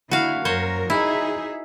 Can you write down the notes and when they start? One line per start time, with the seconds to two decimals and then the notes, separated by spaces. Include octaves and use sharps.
0.11 D3 A#3 E4 F#4 F5
0.45 F#2 A#4 C5 C#5
0.90 D#4 E4 G#4 E5